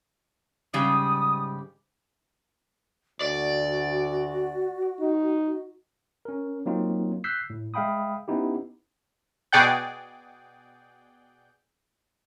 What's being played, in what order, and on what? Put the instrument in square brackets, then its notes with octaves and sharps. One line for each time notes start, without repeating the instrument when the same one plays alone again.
[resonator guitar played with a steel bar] G#2 C#3 G3 [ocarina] D#6
[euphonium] D2 [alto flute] F#4 [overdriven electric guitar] D5
[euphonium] D#4
[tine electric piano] C#4 A#4
F#3 A#3 C4 D#4 F4
E6 F#6 G6 B6 C7
A2
G#3 E5 F5 G5 B5 D#6
B3 C#4 D#4 E4 G4
[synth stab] B2 G#4 D5 F#5 G5 G6